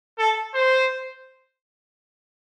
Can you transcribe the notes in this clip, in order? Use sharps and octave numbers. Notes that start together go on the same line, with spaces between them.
A4
C5